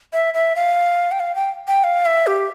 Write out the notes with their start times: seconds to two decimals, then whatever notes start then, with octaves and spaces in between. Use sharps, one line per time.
0.13 E5
0.34 E5
0.56 F5
1.12 G5
1.20 F5
1.35 G5
1.67 G5
1.84 F5
2.06 E5
2.27 G4